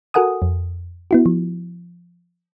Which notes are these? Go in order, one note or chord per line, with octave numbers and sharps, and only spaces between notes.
F#4 A4 A#4 F#5 G#5 D#6
F2
B3 E4 F#4
F3